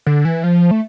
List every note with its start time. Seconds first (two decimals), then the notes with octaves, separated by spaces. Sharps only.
0.06 D3
0.25 E3
0.44 F3
0.71 A3